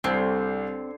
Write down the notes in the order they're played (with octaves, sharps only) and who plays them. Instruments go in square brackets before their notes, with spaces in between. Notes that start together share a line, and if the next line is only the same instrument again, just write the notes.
[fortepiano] C2 [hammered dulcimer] D3 C5 C#5 [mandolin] C4